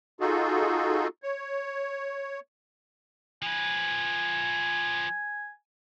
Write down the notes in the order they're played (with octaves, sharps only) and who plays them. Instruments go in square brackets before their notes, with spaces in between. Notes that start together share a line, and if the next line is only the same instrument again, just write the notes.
[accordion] D#4 F4 F#4 G#4 A4
C#5
[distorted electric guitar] F3 B4 [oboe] G#5